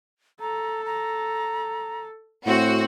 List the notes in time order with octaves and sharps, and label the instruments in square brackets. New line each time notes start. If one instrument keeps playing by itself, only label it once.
[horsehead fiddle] A4 [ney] A#5
[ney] A#5
[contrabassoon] A2 [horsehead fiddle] C4 [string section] F#4 [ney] C5